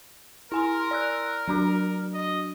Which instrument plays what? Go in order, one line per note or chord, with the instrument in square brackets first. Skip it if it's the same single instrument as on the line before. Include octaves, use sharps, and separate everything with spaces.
[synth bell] E4 G#5 C6 [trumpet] A#4
[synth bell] D5 E6 F#6
F#3 D4 F#4
[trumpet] D#5